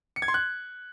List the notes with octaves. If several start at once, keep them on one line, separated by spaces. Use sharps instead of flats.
C#7
G#6
C6
F#6